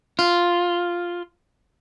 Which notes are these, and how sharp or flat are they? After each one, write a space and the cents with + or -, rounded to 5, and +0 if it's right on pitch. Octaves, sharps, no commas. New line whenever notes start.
F4 +0